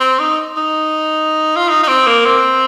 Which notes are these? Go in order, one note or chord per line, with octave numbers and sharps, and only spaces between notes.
C4
D#4
D#4
F4
D#4
D#4
C4
A#3
C4